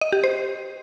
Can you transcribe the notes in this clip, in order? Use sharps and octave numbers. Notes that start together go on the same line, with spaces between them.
D#5
G4
C5